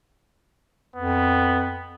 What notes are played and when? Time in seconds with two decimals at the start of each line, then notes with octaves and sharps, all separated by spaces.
0.96 F2 B3